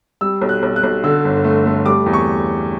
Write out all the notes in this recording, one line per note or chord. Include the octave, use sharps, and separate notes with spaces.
G3 E6
B1
F#6
B1
F#6
B1
D3 E6
G1
A3
A3
G3 D6
E2
C#6